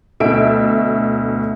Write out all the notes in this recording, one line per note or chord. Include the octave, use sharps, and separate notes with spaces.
D2 B2 A4 E5 D7